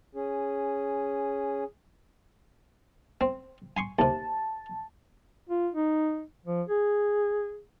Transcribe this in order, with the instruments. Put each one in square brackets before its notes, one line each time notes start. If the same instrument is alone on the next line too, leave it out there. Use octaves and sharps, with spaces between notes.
[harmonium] C#4 G#4
[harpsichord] C4
G#5 C6 C#6
[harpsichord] D#2 C3 [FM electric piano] A5
[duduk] F4
D#4
F3
G#4